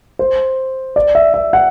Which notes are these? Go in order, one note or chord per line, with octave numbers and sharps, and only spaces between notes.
C5
D5
E5
E5
F#5